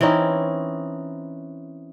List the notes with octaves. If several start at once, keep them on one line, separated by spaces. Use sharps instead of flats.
E3 C4 C#4 D#4